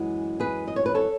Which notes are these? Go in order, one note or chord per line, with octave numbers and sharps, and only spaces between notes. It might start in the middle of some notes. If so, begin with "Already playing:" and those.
Already playing: F#2 E3 G#3
G#4 B4
D#5
C#5
B4
A4 C#5